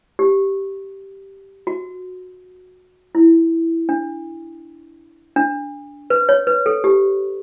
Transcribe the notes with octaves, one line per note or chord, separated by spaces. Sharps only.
G4
F#4
E4
D4
D4
B4
C#5
B4
A4
G4